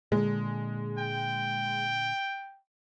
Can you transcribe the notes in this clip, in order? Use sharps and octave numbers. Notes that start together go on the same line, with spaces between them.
A#2 D3 G#3
G5